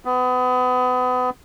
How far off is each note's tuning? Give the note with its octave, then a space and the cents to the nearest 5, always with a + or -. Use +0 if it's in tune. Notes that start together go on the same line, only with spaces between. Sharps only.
B3 +30